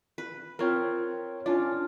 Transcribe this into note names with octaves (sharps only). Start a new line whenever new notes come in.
B4
C4 F4 A#4 C#5 G5
C#4 D4 F4 D5